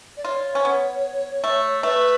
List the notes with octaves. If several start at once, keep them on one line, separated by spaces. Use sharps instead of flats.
D5
F4 C#5
C#4
B3
A3
A3 B4